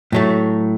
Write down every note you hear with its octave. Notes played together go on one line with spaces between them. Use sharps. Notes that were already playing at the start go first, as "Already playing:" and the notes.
A2 F#3 A3